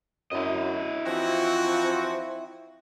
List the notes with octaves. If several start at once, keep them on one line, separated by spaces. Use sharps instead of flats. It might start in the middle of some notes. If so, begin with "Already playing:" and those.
F#2 E4 D#5
E3 F3 C4 F4 F#4